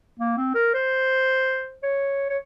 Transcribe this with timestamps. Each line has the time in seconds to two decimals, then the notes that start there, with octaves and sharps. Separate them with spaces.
0.20 A#3
0.37 C4
0.55 A#4
0.74 C5
1.83 C#5
2.30 C#5